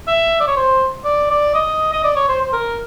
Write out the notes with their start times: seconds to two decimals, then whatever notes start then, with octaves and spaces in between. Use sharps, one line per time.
0.07 E5
0.40 D5
0.47 C#5
0.56 C5
1.04 D5
1.30 D5
1.54 D#5
1.93 D#5
2.04 D5
2.16 C#5
2.28 C5
2.41 C5
2.53 A#4